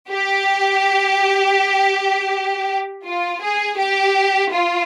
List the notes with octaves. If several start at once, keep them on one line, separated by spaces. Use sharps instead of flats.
G4
F4
G#4
G4
F4